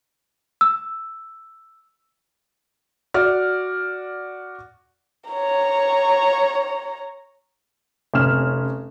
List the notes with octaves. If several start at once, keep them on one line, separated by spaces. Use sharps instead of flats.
E6
F#4 D5 F6
C#5 A#5
F1 C3 C#4 F6 E7